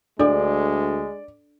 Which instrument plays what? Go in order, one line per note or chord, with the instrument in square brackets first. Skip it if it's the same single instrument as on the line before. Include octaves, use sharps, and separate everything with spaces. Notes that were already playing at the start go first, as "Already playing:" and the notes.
[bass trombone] D2 [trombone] G#3 [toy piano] D4 A4 [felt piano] D5